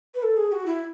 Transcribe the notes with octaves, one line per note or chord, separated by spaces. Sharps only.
B4
A4
G#4
F#4
E4